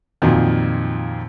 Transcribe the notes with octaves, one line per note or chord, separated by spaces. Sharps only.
F2 A#2 D#3 F#3